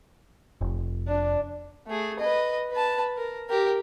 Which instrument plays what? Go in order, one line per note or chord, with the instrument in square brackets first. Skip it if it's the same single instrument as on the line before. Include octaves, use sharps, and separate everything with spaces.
[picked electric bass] F1
[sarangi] D4
[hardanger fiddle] A3 G#4
B4 D#5
B4 A5
A#4
G4 A#4